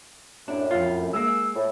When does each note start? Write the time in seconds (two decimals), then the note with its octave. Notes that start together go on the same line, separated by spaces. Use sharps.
0.48 F#2 A2 D4
0.71 F2 F4
1.14 G#3 A#3 E6
1.55 A2